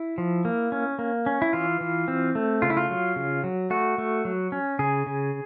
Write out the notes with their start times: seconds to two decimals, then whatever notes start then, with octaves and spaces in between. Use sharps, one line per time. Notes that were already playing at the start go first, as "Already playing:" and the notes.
Already playing: E4
0.18 F3
0.45 A#3
0.72 C#4
0.99 A#3
1.26 C#4
1.42 E4
1.53 E3 F4
1.81 E3
2.08 C4
2.35 A3
2.62 C#3 F4
2.70 E4
2.77 F4
2.90 F#3
3.16 C#3
3.44 F#3
3.70 A3 F#4
3.98 A3
4.25 F#3
4.52 C#4
4.79 C#3 G#4
5.06 C#3